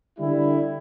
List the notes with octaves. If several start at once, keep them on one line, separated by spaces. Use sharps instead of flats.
D3 G3 E4